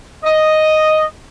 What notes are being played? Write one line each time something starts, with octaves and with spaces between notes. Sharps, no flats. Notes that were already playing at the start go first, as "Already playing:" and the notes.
D#5